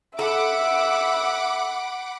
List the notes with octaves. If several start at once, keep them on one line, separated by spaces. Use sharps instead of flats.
A4 E5 F#5 B5 D6